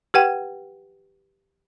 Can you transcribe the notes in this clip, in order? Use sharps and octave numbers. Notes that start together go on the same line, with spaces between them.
G4 B4 F#5 G5